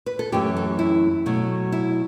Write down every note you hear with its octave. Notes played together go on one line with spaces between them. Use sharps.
B4
A4
F#2 E3 A3 G4
A4
E4
B2 F#3 A3
E4